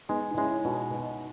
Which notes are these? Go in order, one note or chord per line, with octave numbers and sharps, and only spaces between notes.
G#3 B3 D#4
D#4
G#3 C#4 E4
B2 D#4 F#4
B2